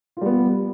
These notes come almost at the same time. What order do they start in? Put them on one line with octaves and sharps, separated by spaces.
F4 G3 B3